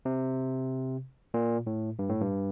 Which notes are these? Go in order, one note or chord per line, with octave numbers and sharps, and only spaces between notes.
C3
A#2
A2
G2
A2
G2